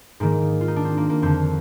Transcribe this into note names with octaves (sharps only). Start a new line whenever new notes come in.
G#2 D#3 A#3
F4
D#4
D4
C4
A#3
A#3
F2 D3 C4